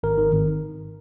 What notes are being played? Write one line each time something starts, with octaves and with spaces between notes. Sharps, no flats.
G#1 A#4
D#3
G#1